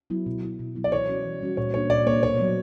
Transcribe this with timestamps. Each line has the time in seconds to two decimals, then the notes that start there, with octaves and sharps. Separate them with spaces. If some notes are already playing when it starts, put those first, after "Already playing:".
0.10 F#3 B3 E4
0.26 B2
0.43 F#3 B3 E4
0.59 B2
0.75 F#3 B3 E4
0.84 D5
0.92 E3 C#5
1.08 G3 C#4 F#4
1.25 E3
1.41 G3 C#4 F#4
1.57 A#2 C#5
1.74 A#3 D4 C#5
1.90 A#2 D5
2.07 A#3 D4 C#5
2.22 B2 C#5
2.39 F#3 B3